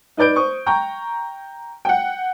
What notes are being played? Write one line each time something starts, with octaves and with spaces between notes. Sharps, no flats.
D#4 B4 D5 G6 D7
C5 C#6 D#6
G5 A#5 C#6 G6
F#5 G5